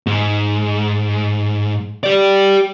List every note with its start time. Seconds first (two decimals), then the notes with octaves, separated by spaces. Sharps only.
0.07 G#2
2.03 G4 D5